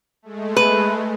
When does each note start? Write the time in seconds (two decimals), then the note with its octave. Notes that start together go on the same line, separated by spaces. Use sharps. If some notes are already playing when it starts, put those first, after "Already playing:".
0.22 G#3 A3
0.57 B4